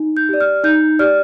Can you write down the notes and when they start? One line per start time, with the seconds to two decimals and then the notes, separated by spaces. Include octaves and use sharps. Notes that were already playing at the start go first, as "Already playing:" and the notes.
Already playing: D#4
0.17 G6
0.29 G4 D5
0.41 F6
0.64 D#4 G6
0.99 G4 D5 F6